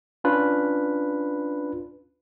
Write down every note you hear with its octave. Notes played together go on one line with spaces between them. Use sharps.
C#4 D4 F4 B4